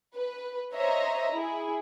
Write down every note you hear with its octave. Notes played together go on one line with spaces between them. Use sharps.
B4
C5 C#5 D#5 E5 A#5
E4 G#4